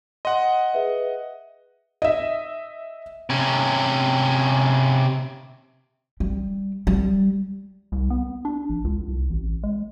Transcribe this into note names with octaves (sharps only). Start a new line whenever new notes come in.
D#5 F#5 C6
G#4 B4 E5
D#5 E5
C3 C#4
G3
G3
C2
B3
D4
A#1
C#2
C2
A1
G#3